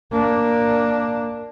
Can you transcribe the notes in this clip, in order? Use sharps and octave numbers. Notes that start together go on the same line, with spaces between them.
A#3 D4